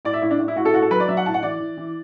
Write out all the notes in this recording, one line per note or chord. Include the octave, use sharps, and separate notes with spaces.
A2 D5
E5
A2 E4
D4
A2
E4
A2 F#4
A4
A2 F#4
A4
F#3 B4
D5
F#3 E5
F#5
A2 A5
F#5
E3 D5
E3
E3